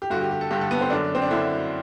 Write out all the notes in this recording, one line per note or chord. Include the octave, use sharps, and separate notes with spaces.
G4
G2 D3 F#4
G4
G4
A4
G2 D3 G4
A4
B3
C4
F#2 D3 D4
C4
D4
F#2 D3 E4